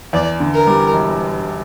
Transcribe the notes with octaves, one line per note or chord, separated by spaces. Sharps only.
E2 D5
D3
A#4
G3
E1